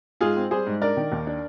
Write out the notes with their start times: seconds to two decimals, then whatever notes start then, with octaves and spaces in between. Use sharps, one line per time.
0.21 G#2 F4 G#4
0.36 C4
0.51 G3 G#4 C5
0.67 G#2
0.82 D4 A#4 D5
0.97 D#3
1.12 D#2
1.27 D4